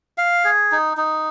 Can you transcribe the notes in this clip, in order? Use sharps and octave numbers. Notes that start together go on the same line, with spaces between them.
F5
G#4
D#4
D#4